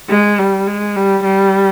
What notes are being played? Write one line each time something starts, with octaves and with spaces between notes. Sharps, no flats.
G#3
G3
G#3
G3
G3